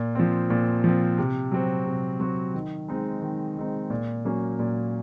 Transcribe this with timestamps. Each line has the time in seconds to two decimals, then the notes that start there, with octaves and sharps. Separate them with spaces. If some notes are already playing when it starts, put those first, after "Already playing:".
Already playing: A#2
0.15 F3 C4
0.50 A#2
0.84 F3 C4
1.18 C3
1.52 F#3 C4 F#4
1.86 C3
2.20 F#3 C4 F#4
2.54 D#3
2.88 G#3 C4 D#4
3.22 D#3
3.57 G#3 C4 D#4
3.90 A#2
4.25 F#3 A#3 C#4
4.59 A#2